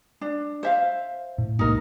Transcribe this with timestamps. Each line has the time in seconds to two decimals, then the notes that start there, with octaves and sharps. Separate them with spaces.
0.21 D4
0.63 C5 E5 F5
1.38 A2
1.59 C2 G#2 A#3 D#4 A#4